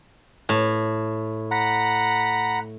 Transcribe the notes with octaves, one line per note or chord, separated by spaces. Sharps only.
A2
F#5 A#5 B5